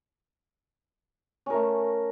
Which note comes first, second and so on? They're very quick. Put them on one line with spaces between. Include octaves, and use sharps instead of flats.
C#4 A#4 A3